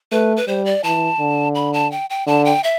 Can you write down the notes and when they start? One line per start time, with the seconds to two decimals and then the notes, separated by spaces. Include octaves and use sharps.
0.12 A3 B4
0.37 B4
0.48 G3 C5
0.65 D5
0.84 E3 A5
1.20 D3
1.55 B5
1.74 A5
1.92 G5
2.10 G5
2.27 D3 A5
2.45 G5
2.64 E5